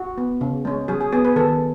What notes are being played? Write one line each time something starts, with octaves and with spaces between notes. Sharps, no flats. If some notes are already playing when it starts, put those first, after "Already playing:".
Already playing: F#4
B3
C#3
G#3 C#4
F#3 G#4
G#4
B3 G#4
B4
D#3 A4